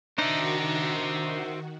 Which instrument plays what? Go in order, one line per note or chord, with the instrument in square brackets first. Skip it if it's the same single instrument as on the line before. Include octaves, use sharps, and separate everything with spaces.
[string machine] D#3 F#4 [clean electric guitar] D4 D#4 [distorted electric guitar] C5 E5